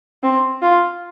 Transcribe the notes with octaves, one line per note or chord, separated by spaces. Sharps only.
C4
F4